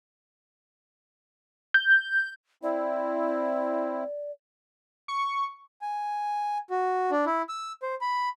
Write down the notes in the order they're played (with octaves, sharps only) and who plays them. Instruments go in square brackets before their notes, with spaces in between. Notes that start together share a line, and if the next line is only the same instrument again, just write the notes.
[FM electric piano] G6
[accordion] C4 E4 [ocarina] D5
[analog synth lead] C#6
[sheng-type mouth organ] G#5
F#4
D4
E4
E6
C5
B5